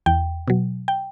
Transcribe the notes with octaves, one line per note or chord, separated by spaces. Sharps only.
E2 G5
B2 F#3
G5